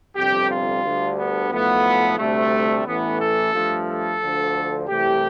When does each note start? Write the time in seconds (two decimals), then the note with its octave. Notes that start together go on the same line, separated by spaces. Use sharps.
0.16 G1 F2 C3 G3 G4
0.50 F4
0.84 D2 D3 G3
1.17 B3
1.51 B1 A2 F3 A3 B3
2.18 D2 C3 G3 A3
2.86 A1 A2 E3 A3 B3
3.20 A4
3.54 G2 F3 A3
3.88 A4
4.21 D2 D3 F3
4.89 C2 C3 E3 A3 G4